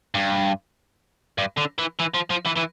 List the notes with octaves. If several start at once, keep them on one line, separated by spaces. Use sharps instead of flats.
G2
G2
D3
E3
E3
F3
F3
E3
E3